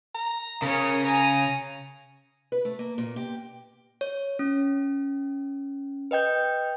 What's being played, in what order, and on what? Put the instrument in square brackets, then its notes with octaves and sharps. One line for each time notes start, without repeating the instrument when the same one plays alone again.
[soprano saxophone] A#5
[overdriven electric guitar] C#3 [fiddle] C#4 C#5 [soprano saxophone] A#4
[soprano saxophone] C#4 [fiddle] G#5 A#5
[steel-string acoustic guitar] B4
A3
A#3
A#2
G4
[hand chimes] C#5
C#4
B4 D#5 G5 G6